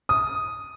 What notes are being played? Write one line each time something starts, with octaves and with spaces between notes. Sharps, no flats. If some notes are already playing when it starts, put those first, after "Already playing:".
D#6